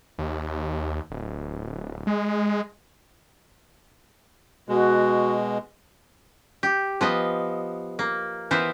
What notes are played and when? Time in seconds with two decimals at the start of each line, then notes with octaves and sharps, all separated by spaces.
0.18 D#2
1.10 D1
2.07 G#3
4.69 B2 G#3 F#4
6.63 G4
7.01 F3 B3 D#5
7.99 A#3
8.51 E3 B3 A#4 C5